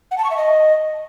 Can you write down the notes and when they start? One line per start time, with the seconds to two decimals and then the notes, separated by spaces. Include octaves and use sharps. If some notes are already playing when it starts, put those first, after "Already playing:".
0.11 F#5
0.18 A5
0.24 C#6
0.31 E5
0.37 D#5